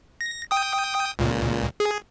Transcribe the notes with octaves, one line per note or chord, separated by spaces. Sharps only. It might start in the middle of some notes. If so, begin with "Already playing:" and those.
A#6
G5 D#6
C#2 A#2
G#4